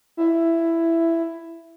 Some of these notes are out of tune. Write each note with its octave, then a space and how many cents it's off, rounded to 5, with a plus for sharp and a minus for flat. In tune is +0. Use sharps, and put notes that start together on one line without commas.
E4 +10